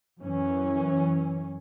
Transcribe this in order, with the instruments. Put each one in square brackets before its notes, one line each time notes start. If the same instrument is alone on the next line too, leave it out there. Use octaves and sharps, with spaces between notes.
[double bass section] F#2 E3 C#4